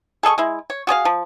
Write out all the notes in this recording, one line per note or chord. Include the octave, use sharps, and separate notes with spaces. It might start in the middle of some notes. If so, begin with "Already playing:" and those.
G#4 A4 D#5 C#6
G#3 E4
C#5
F#4 G#4 C#5 F5
F3